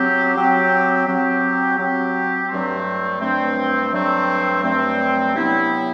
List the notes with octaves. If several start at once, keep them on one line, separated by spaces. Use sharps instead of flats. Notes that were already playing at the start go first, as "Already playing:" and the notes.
Already playing: F#3 C4 G4
F#3 C4 G4
F#3 C4 G4
F#3 C4 G4
G2 F#3 A3 C4
G2 F#3 A3 C4
G2 F#3 A3 C4
G2 F#3 A3 C4
C3 F#3 B3 E4 G4